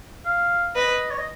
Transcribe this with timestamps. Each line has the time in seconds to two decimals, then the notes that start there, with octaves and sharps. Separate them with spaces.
0.26 F5
0.75 B4 D#5
1.10 C#5
1.18 D#5